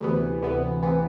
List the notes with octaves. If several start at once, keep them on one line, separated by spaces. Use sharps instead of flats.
D2 C3 E3 B3
D2 C3 E3 B3
C3 E3 B3